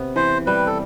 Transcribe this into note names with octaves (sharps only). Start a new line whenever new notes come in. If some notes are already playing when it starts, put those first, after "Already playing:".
Already playing: C3 B3
E3 C5
G3 B4
A4